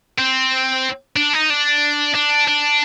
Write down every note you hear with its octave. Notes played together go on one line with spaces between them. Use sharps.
C4
D4
D#4
D4
D4
D4